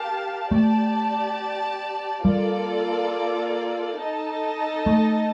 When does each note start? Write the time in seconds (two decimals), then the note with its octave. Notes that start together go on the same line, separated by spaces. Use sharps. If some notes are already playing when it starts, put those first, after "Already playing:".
Already playing: G4 A#4 F5 A5
0.51 A3 G4 D5 A5
2.25 G3 A#3 F4 A4 D5
3.98 D#4 A4 D#5 A5
4.86 A3